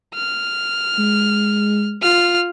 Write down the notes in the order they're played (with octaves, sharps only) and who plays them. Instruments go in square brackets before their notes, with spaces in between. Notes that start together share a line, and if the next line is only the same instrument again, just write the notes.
[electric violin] F6
[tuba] G#3
[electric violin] F4 F6